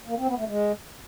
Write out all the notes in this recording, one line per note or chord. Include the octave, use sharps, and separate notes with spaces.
A#3
C4
B3
A3
G#3